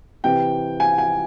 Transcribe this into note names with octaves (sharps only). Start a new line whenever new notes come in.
C3 E3 G5
G#5
G#5